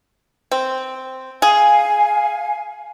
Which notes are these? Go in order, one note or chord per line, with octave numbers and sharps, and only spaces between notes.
C4
G#4 F5 G#5